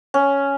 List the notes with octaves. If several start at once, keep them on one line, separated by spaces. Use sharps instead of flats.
C#4